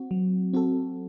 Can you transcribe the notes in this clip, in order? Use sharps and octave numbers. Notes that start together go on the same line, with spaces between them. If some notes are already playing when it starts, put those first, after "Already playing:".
Already playing: C4 F#4
F#3
C4 F#4 A4